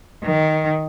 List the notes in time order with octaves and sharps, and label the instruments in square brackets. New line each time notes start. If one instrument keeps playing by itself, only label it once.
[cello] D#3